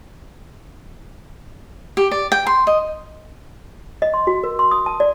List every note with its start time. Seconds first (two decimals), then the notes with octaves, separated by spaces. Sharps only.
1.97 G4
2.11 D5
2.32 G5
2.47 C6
2.67 D#5
4.02 D#5
4.14 C6
4.27 F#4
4.44 A#4
4.59 C6
4.71 D#6
4.86 A5
5.00 D5